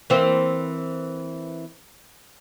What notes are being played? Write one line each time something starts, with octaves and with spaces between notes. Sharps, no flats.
E3 A#3 C4